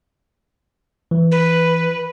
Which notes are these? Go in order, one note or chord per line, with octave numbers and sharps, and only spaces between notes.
E3
B4